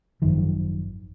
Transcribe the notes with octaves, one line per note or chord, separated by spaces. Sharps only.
G#1 F#2 D#3 F3